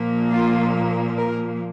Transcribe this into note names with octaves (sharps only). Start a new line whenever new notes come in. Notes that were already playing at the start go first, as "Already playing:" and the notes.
Already playing: A#2 F3 A#3
F4
A#4